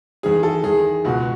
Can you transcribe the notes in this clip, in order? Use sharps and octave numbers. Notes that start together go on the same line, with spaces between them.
E2 D#3 G#4
A4
E2 D#3 G#4
C#2 B2 F#4